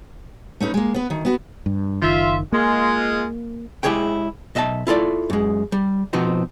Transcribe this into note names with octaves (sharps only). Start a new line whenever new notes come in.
A3 C#4 D#4 B4
G#3 A#3
B3 B4
D2 D#3
B3 F#4 B4
G2
F#1 D#3 F4 E5
G#3 A#3 F4
G#3 E4 G4 G#4 C#5 G5
B1 D#5 E5 G5 A5
E4 F4 A4 D5
F#2 G#3
G3
B2 F3 B3 C4 D#4 F#4